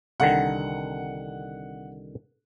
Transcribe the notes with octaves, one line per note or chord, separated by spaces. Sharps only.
C2 D3 D#3 F#5